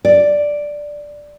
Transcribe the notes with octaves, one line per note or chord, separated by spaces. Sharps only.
D5